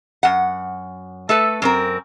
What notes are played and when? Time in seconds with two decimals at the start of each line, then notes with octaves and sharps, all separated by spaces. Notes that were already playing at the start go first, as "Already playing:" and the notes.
0.23 F#2 F#5
1.29 A3 A4 B4
1.62 F#2 C4 A#4